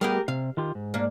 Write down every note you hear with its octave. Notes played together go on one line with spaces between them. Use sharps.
G3 A3 B3 G4 G#4 A#4
C3 F5
D#3 F4 G4
G#2
A#3 D4